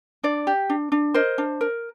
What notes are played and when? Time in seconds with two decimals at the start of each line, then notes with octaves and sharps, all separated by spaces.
0.24 D4 D5
0.47 G4
0.70 D4
0.92 D4
1.14 A#4 C5 D#5
1.38 D4
1.61 A#4